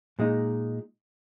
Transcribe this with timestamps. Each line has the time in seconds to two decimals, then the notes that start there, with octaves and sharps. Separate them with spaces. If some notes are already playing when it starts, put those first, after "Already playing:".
0.19 A#2 G#3 D#4